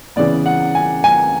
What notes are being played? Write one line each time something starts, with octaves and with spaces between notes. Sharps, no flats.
C#3 E3 B3 D5
F#5
G#5
G#5